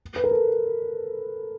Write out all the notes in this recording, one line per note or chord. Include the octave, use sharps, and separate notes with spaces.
B4
A#4
A4